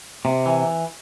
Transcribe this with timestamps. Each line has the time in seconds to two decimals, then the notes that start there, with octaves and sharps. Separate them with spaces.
0.25 C3
0.46 E3